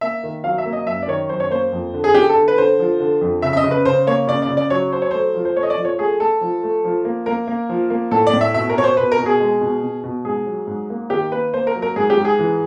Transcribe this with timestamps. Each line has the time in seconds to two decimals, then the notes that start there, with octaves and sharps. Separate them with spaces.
0.01 A#3 E5
0.23 D#3
0.44 F#3 F5
0.58 E5
0.65 A#3
0.73 D#5
0.86 F#2 E5
1.02 D5
1.08 D#3 C#5
1.29 F#2 C5
1.40 C#5
1.50 A#3 C5
1.72 F2
1.94 D3
2.04 G#4
2.14 D3 G4
2.29 A4
2.36 D3
2.48 B4
2.57 D3 C5
2.79 F3
3.00 D3
3.21 F2
3.42 C#3 E5
3.53 E5
3.57 D#5
3.64 C#3
3.71 B4
3.85 C#3 C5
4.07 A#3 C#5
4.27 C#3 D5
4.42 D5
4.49 C#3
4.57 D5
4.70 F#3 C#5
4.92 F#3 C5
5.02 C#5
5.11 A3 C5
5.35 F3
5.45 C5
5.56 A3 C#5
5.63 D#5
5.70 D5
5.77 F3
5.85 C#5
5.99 A3 G#4
6.20 A3 A4
6.41 F3
6.63 A3
6.84 F3
7.05 A#3
7.26 A#3 A#4
7.47 A#3
7.69 F3
7.90 A#3
8.11 A2 A4
8.27 D5
8.33 A2
8.41 E5
8.54 B2 E5
8.69 A#4
8.77 B2 C#5
8.84 C5
8.97 B2 B4
9.12 A#4
9.18 B2
9.26 G#4
9.40 G#3
9.61 B2
9.83 B2
10.04 B2
10.25 G#2 G#4
10.47 F#3
10.67 G#2
10.90 A#3
11.10 D#3 G4
11.32 A#3 B4
11.53 A#3 C5
11.67 A#4
11.75 F#3
11.82 A#4
11.96 G#2 G#4
12.10 G4
12.17 G#2
12.25 G#4
12.39 E3